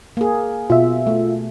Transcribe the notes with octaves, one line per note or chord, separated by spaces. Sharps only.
A#3 G#4
B2 F4 E5
A3